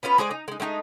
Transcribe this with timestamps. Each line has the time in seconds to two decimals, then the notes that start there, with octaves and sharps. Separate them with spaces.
0.03 B3 C#4 F4 B4
0.18 G#3 G#4 C5 D5
0.31 D#4
0.48 G#3 D#4
0.60 G#3 A3 C4 D#4